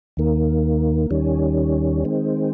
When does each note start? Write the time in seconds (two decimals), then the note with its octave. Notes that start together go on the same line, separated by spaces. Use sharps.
0.17 D#2 D#3 A#3
1.11 D#2 D#3 G3 C#4
2.05 D#3 G#3 C4